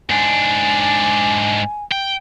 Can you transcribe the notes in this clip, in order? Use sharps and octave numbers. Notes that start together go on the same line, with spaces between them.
G#2 D4 G#5
G5